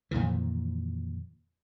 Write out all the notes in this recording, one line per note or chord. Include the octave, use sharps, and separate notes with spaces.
F2 A#2 D#3 E3